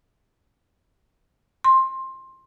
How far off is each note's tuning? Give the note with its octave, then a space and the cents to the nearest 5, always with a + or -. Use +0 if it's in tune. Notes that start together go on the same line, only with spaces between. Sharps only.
C6 +15